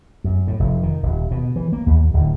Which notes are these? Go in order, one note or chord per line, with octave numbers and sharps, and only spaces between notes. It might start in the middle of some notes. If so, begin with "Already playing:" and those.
F#2
A2
F1
D#3
D#1
B2
E3
A#3
D#2
D1